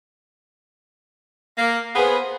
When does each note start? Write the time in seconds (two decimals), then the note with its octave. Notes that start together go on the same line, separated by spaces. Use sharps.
1.58 A#3
1.96 B3 G#4 B4 C5